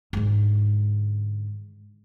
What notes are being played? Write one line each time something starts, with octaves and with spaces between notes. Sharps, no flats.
G#2 D3